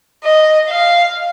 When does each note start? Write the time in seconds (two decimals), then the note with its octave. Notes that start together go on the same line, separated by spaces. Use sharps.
0.24 D#5
0.69 F5